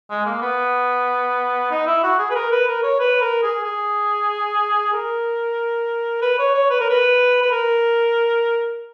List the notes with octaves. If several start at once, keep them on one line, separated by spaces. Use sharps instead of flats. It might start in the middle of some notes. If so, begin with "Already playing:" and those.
G#3
A#3
B3
D#4
E4
F#4
G#4
B4
A#4
B4
A#4
C#5
B4
A#4
G#4
G#4
A#4
B4
C#5
C#5
B4
A#4
B4
B4
A#4